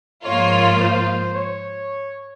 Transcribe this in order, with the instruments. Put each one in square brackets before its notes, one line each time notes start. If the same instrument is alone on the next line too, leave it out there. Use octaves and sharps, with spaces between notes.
[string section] G#2 F3 A#3 F4 [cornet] C#5
[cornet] C5
C#5